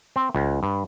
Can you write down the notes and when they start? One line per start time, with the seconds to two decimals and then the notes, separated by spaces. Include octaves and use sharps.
0.16 C4
0.35 C#2
0.63 G2